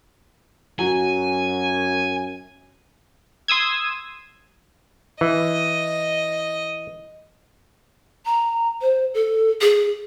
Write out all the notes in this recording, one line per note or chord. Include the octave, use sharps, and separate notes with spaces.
F#2 F#3 G#5
C6 D#6 E6 G#6
E3 D#5
A#5
C5
A4
G#4